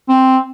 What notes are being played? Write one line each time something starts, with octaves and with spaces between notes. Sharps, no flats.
C4